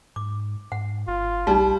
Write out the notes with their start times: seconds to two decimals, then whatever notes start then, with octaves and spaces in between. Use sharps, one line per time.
0.16 G#2 D6
0.72 G#2 F#5
1.08 G1 F4
1.47 B1 G3 D#4 A5